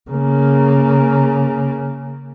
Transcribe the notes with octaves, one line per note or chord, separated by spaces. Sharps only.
C#3 A#3